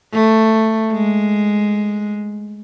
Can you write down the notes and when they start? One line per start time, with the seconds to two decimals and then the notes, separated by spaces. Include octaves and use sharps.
0.13 A3
0.92 G#3